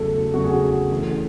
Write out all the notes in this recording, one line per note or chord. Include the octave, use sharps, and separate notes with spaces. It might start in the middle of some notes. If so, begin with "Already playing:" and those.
Already playing: E2 C#3 F#3 A3 A4
E2 C#3 F#3 A3 F#4
G#4
F#4
F#2 E3 A3